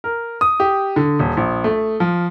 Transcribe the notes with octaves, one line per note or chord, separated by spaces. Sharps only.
A#4
D#6
G4
D3
D#1
A#1
A3
F3